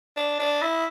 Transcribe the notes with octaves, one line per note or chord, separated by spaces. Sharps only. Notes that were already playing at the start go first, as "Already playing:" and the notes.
D4
D4
E4